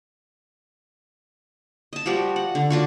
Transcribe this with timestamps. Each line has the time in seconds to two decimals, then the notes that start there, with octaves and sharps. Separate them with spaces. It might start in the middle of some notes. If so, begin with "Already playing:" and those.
1.93 D#5 A5
2.06 F3 G3 F#4 G4
2.36 F#5
2.55 D3
2.70 D4 F4 F#4